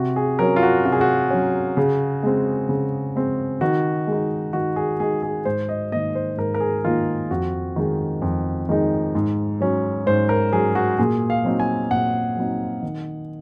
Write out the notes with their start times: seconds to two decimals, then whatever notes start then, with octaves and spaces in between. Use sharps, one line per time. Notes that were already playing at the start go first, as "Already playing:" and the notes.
Already playing: C3 F#4
0.16 G#4
0.39 F#3 C#4 A#4
0.56 F4
0.63 F#4
0.85 C3 F#4
0.92 G#4
1.01 F#4
1.31 F#3 C#4
1.77 C#3
2.23 G#3 C4
2.69 C#3
3.16 G#3 C4
3.61 D#3 F#4
4.07 G#3
4.12 D#4
4.53 D#3 F#4
4.76 G#4
5.00 G#3 D#4 G#4
5.23 G#4
5.45 G#2 C5
5.69 D#5
5.92 D#3 A#3 D#5
6.15 C5
6.37 G#2 A#4
6.54 A#4
6.60 G#4
6.85 D#3 A#3 F4
7.31 F2 F#4
7.76 D#3 G#3 D#4
8.22 F2
8.69 D#3 G#3 D#4
9.15 G#2
9.61 F#3 C#4
10.06 G#2 C5
10.29 A#4
10.53 F#3 C#4 G#4
10.75 F#4
10.98 A#2 G#4
11.30 F5
11.45 F#3 C4 D#4
11.60 G#5
11.91 A#2 F#5
12.36 F#3 C4 D#4
12.82 D#3